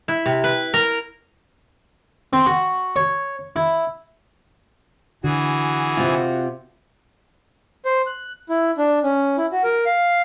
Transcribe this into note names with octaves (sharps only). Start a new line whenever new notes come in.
E4
C3
B4
A#4
C4
F#4
C#5
E4
D3 E3 F#4 G#4
C3 F4
C5
F#6
E4
D4
C#4
E4
F#4
A#4
F5